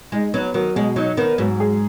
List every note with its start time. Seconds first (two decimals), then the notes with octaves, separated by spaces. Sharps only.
0.12 G#3 D#4
0.34 F#3 B3
0.54 D#3 F#3
0.76 B2 G#3
0.96 F#3 D#4
1.17 D#3 B3
1.38 G#2 F#3
1.60 G#4